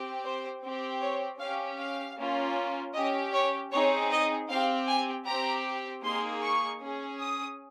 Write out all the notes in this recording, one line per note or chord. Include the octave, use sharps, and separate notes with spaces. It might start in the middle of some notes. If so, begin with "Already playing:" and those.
Already playing: C4 G4
C5
C4 G4
C#5
C#4 G4 F5
F5
A#3 C#4 F4
C#4 G4 D#5
C#5
C4 D#4 G#4 C#5
D#5
C4 G4 F5
G#5
C4 G4 A#5
A#3 D#4 G#4 C6
C#6
C#4 G#4
D#6